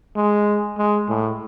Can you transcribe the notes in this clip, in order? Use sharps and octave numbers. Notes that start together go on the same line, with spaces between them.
G#3
G#3
A2